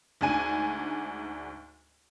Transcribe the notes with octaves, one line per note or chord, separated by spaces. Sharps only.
D2 G#2 D4 G#5 D#7